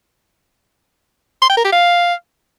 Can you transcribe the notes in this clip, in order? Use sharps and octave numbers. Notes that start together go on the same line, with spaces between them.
C6
G5
A#4
G4
F5